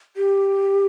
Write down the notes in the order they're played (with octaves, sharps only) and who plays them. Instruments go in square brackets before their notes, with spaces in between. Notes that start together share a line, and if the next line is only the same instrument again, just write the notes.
[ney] G4